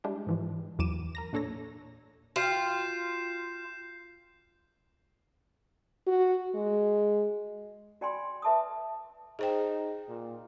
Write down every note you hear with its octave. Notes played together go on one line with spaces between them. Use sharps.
G3 G#3 D4 E4 G4
G#2 E3 F3
E2 E3 F#3 D6 D#7 E7
A#4 A#5 A#6
A#2 D4 A4 C#5 A#6
F4 F#4 G5 G6 C7 E7
F#4
G#3
F#4 D5 G5 G#5 B5 C6
B4 E5 A5 D6 D#6
D#4 G#4 C5 G5
A#2